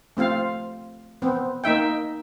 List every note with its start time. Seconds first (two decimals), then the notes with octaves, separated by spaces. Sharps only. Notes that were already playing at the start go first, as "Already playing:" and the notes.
0.17 A3 C4 F4 F5
1.22 B3 C4
1.64 A#3 D#4 E5 G5